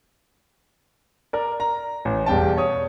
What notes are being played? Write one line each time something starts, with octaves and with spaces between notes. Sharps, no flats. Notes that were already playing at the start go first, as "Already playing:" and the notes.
A#4 D5
A#5
A1
E1 G3 G5 A5
C#5 D#6